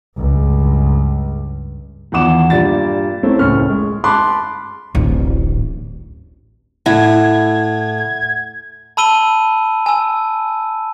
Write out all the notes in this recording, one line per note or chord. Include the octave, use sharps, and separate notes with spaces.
C#2 G2
E2 D#3 F3 F#5 D6 E7
G2 A#2 D5 A6
A3 A#3 C4 C#4 E4
F#1 C#2 A2 C#6 F6
G#3
A5 B5 C6 D6 F#6
D1 A1
A2 E4 F#5 G#6
A5 B5 E6 D#7 G7
G#5 E6